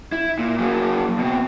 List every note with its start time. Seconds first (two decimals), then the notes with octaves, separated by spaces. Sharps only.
0.12 E4
0.39 A#2
0.59 F#3 A#3
1.19 B2 C4